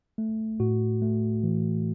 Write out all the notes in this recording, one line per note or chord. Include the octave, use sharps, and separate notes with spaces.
A3
A2 F#4
A3
E3